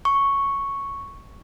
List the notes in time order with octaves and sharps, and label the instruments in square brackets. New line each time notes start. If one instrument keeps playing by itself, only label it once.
[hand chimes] C#6